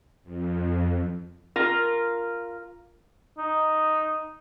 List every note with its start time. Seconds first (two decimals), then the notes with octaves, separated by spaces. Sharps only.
0.23 F2
1.56 F4 A#4
3.38 D#4